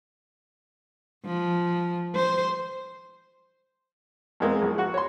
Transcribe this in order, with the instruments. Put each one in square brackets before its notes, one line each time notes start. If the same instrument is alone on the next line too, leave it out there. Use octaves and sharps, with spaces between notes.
[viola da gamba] F3
C5
[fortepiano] E2 E3 G#3 A#3 C4
A#1
F#4 F#5
C#5 C6